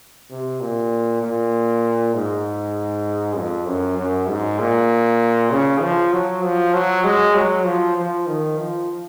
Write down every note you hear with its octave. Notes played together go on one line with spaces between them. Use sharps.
C3
A#2
A#2
G#2
F2
F#2
F#2
G#2
A#2
C#3
F3
F#3
F3
F#3
G#3
F#3
F3
F3
D#3
F3